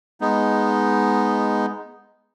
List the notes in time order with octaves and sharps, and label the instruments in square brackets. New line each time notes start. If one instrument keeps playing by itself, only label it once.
[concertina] G#3 B3 D#4